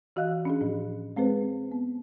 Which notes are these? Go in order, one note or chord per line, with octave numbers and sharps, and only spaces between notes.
E3 F#4 D#5 F5 F#6
C#4 D4 G#4
A2 F3
G#3 C4 G#4 B4 C5
B3